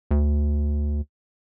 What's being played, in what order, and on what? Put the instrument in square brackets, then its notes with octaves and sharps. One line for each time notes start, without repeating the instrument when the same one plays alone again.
[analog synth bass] D2